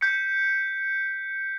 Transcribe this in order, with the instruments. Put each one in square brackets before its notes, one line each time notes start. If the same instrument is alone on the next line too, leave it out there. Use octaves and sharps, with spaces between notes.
[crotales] G6 B6 C#7